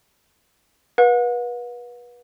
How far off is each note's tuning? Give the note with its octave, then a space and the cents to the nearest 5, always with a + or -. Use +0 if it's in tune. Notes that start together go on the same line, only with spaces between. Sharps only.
B4 -30 F#5 -45